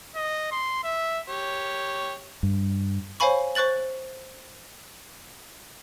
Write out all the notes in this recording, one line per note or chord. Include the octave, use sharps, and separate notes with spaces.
D#5
C6
E5
G4 C#5
G2
C5 C#5 F5 G#5 B5 C#6
C5 C#6 F#6 A6 F#7